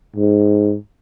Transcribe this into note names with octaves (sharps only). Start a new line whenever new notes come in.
G#2